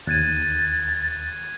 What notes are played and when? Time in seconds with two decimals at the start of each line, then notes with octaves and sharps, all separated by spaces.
0.07 D#2 F#6 G#6 A6 D#7